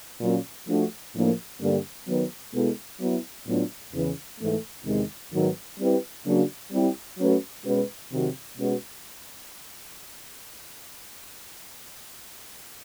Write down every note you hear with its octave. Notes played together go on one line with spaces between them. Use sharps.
A#2 F#3 A#3 C#4
F3 A3 D4 F#4
A2 F3 A#3 D4
G2 D3 G3 A#3 D4
D#3 F#3 B3
B2 G#3 B3 E4 A4
F#3 B3 E4
A2 F#3 B3 D4 F4
E2 C#3 E3
G#2 E3 A3
E2 C3 D#3 G#3
G#2 D#3 F#3 B3
G3 C4 E4 G4 B4
C#3 F#3 A#3 D4 F#4
G3 C4 E4 G4
F#3 A3 C#4 F#4 B4
B2 G#3 C#4 F#4 B4
C3 D#3 F#3
B2 G#3 C#4 F#4 B4